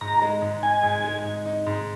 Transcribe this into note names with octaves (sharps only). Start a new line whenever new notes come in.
G#2 A#5
G#3
G#2
D#4 G#5
G#2
G#3
G#2
D#4
G#2